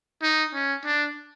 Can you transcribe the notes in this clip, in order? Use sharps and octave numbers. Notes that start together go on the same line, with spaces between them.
D#4
C#4
D4